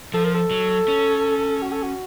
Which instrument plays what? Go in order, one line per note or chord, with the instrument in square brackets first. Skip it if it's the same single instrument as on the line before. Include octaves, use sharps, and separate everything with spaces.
[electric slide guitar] F3 [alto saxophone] A4
[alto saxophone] A#4
A4
[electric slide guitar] F#3
C#4
[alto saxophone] F#4
A4
F#4